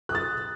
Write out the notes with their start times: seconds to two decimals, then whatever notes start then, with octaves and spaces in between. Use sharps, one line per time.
0.09 F#6
0.12 D#6
0.15 A6